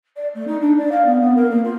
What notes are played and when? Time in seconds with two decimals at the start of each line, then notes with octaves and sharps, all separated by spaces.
0.16 D5
0.34 A3
0.47 D#4
0.61 D4
0.78 D5
0.91 F5
1.05 B3
1.21 B3
1.36 A#4
1.50 A#3
1.64 F4